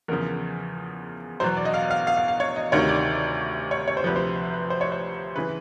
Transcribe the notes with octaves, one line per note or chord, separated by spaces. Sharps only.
E2 C#3 F3 A#4
E2 B2 F#3 C5
D5
D#5
F5
F5
F5
F5
F5
C#5
D#5
D2 C3 D#3 C#5
D5
C#5
C#5
C5
D2 C3 F3 B4
C5
B4
C5
C#5
C5
C#3 E3 B4